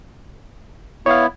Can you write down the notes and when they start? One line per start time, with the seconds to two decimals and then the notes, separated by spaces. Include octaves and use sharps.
1.06 B3 E4 C#5 F5